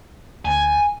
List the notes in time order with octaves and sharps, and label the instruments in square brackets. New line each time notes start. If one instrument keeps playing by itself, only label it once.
[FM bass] D2 [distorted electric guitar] G#5